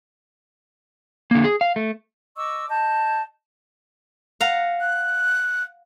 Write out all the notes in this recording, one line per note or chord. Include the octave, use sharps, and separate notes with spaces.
D3 A#3
G#4
F5
A3
D#5 C#6 D6 E6
D#5 A5 G6
F5 F#5 A#5
F#6